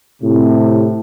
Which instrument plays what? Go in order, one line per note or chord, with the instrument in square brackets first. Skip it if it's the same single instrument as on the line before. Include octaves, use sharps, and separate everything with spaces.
[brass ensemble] A2 C3